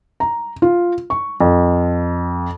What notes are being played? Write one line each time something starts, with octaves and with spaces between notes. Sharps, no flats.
A#5
F4
C#6
F2